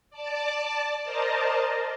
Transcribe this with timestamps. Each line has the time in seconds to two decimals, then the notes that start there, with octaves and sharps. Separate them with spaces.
0.11 D5 A5 D6
1.05 A#4 C5 D5 D#5 A5 A#5